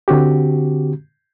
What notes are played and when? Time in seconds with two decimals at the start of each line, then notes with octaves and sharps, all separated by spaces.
0.08 D3 C4 F#4 G4